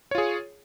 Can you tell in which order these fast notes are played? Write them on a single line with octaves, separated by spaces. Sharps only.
C#5 F4 G#4